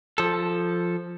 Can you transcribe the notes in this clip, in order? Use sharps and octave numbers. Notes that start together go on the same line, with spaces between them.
F3 A4